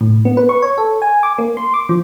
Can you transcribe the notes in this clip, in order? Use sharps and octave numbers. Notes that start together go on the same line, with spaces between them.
A2
B3
B4
C#6
C#5
A4
G#5
D6
A#3
C6
D6
F3